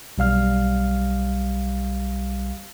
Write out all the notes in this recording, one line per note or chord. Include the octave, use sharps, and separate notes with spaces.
B1 G3 F5 F6